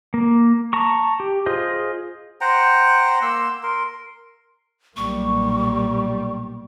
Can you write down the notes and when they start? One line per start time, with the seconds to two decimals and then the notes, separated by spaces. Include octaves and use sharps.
0.14 A#3
0.73 A5 A#5 C#6
1.20 G4
1.46 F4 G#4 C5 D#5
2.41 C5 F#5 G5 A#5
3.22 A#3 C6 E6
3.63 A#4 C6
4.97 B1 A#2 G3 A#3 C#6